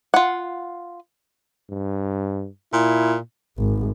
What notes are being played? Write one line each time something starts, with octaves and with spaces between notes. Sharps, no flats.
F4 F#5
G2
A#2 E4
G#1